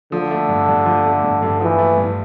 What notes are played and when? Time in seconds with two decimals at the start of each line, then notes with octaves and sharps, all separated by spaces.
0.12 D3 F3
0.31 A3
0.49 G2
0.68 G2
0.86 F3
1.05 A3
1.24 G2
1.42 G2
1.61 E3 F3
1.79 A3
1.98 G2